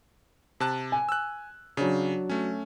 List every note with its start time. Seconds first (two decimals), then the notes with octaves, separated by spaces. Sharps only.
0.60 C3 A5 F#6
0.92 G#5
1.09 E6 F#6
1.77 C#3 F#3 D4
2.29 A3 C#4